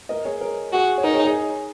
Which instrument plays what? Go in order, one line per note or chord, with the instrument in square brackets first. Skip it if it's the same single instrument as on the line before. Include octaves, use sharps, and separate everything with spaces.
[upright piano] A#4 D#5
G#4 C#5
A#4
[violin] F#4 [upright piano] G#4
[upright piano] C#5
[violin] D#4 [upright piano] A#4
[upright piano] G#4 C#5
G#4 C#5